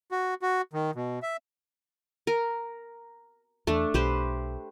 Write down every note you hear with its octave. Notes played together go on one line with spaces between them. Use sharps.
F#4
F#4
D#3
B2
E5
A#4
E2 A3 D4
B1 G4 B4 C5